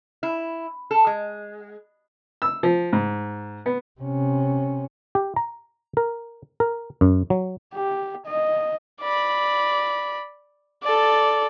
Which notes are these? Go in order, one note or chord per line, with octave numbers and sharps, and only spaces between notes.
E4
A4
G#3
E6
F3
G#2
B3
C3 C#4
G4
A#5
A#4
A#4
F#2
F#3
G4
D#5
D5 B5
A4 D5